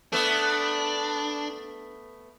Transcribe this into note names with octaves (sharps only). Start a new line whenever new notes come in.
A3 B3 D4